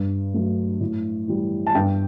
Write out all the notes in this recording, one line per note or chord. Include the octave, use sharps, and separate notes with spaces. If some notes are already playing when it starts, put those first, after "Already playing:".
Already playing: G2
F#3 A3
A2
E3 G3
A5
G2 G5